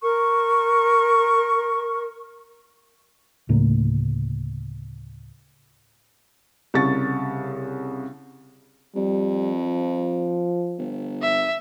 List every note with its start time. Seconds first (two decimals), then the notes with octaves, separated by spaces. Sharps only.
0.02 A#4 C#6
3.49 D2 A2 C#3 A#3
6.74 C2 C#3 C#6 A6
8.95 F2 G3
9.63 F3
10.78 G1
11.22 E5